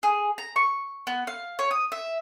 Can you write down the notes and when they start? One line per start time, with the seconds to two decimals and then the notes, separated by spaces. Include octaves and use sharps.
0.03 G#4
0.38 A#5
0.56 C#6
1.07 B3
1.27 F5
1.59 C#5
1.71 D#6
1.92 E5